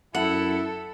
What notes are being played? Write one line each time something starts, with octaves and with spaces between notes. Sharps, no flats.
F#2 E4 A4 F#5